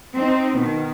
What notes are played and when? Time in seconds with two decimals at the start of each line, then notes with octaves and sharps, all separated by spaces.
0.14 C4 D#4
0.57 B2 D#3